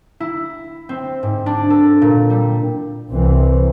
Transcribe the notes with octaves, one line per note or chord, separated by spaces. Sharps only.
E4
C4
G#2
D4
A4
A#2
G3
C2 C3 E3 C4